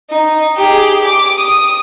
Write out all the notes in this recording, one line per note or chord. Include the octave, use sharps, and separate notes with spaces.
D#4
G4 G#4
D6
D#6